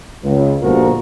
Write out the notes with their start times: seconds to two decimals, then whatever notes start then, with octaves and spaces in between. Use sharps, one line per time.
0.24 C#2
0.62 G1 A#2 F3 F#4 A#4